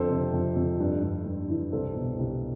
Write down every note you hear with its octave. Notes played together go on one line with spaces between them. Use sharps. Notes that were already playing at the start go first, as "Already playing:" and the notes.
Already playing: F2 D3 A4 C5
C3
F2
F2
G2
G2
G2
E3
C2 A4 C5
B2
C2